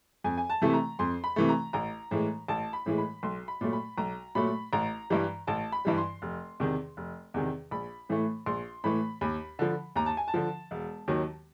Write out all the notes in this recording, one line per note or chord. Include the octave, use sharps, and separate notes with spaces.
F2 G#5
G#5
A5
C3 E3 A3
A#5
F2 C6
B5
C3 E3 A3
A#5
A1 A#5
A2 E3 G#3
A1 A5
B5
A2 E3 G#3
B5
B1 C6
B5
A#2 F#3 A3
B5
B1 A#5
A#2 F#3 A3 B5
A1 A#5
G2 E3 G3
A1 A5
B5
G2 E3 G3
C6
F1
E2 C3 D#3
F1
E2 C3 D#3
A#1 B5
A2 E3 A3
A#1 C6
A2 E3 A3 B5
D#2 B5
D3 F3
D#2 A#5
A5
G#5
A5
D3 F3
E1
D#2 D#3 F#3